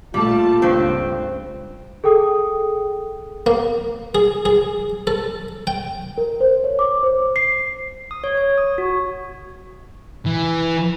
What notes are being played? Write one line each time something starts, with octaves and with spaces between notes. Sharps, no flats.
A#2 G3 A3 F4 A5
C#2 G2 C4
G#4 A4 G5 D#6
A#3
G#4
G#4
A4
G5
A#4
C5
C#5
D6
C5
C5
C7
D#6
C#5
C#5
D#6
F#4
E3